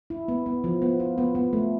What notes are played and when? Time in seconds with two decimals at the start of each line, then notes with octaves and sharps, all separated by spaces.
0.10 E4
0.28 B3
0.46 B3
0.64 F3
0.82 B3
1.00 F4
1.18 B3
1.35 B3
1.53 A3